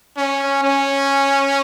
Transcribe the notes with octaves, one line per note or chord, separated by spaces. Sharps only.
C#4
C#4